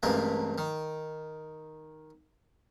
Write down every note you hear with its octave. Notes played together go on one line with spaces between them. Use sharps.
A1 G2 C3 G#3 A#3
D#3